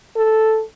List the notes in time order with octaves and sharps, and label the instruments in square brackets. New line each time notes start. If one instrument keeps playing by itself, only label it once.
[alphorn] A4